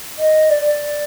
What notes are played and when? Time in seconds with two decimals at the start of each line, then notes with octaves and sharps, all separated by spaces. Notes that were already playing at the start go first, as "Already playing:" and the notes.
0.18 D#5
0.50 D5
0.64 D5